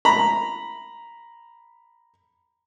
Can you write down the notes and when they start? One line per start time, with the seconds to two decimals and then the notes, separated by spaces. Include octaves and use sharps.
0.05 A#5 B5